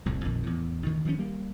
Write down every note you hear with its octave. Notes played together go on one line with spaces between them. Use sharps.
D1 C2 F2
A#1 F2 D#3
E2 A2
D2 D#3
D#3 F3 G#3 C#4
G3 A#3